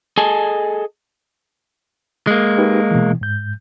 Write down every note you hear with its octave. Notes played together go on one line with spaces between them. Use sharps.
G#4 A4 D#5 G#5 A5
G#3 A#3
D#4 G4 B4
B2 E3
G#2 G6